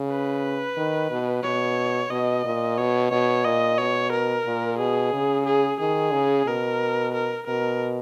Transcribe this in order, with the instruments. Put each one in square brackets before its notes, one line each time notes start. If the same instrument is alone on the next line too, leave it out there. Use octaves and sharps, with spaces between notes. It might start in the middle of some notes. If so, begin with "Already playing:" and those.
Already playing: [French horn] C#3
[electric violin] B4
[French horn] D#3
B2
[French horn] B2 [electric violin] C#5
[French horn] B2 [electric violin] D#5
[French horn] A#2
[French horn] B2 [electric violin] C#5
[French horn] B2 [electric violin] C#5
[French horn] A#2 [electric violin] D#5
[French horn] B2 [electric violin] C#5
[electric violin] A#4
[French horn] A#2
[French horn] B2 [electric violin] G#4
[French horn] C#3
[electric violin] G#4
[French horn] D#3 [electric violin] G#4
[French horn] C#3
[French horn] B2 [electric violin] A#4
[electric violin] A#4
[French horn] B2 [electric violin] A#4